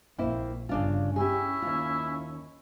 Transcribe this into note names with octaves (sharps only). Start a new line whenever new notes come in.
A#1 A#3 C4 E4
G1 C#3 D4 F4
C#4 E4 G4 G#4
D#2 F4